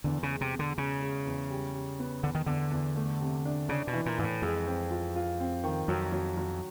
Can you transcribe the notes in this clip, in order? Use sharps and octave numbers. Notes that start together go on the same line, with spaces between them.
E2 D3
C#3
G#3
C3
B2
D3
C#3 G#3
G#3
E2
G3
G3
B3
E2 D3
D#3
E2 D3
E2
A3
C3
D4
C#3 D4
B2
E3
A#2
G#2 E3
A2
F2 G#3
C4
F4
F4
C4
D#3
F2 F#3
F#3
F#3